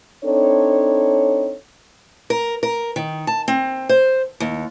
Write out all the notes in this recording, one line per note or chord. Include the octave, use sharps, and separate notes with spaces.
C4 D4 D#4 A4 C#5
A#4
A#4
D#3
A5
C4
C5
D#2